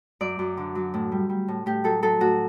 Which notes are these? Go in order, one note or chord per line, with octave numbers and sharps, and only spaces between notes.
F#2 D5
F#2
D3
F#3
A2
G3
G3
A2
A2 G4
F#3 A4
F#3 A4
A2 F#4